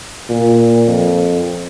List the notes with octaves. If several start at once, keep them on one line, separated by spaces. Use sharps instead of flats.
A#2
F2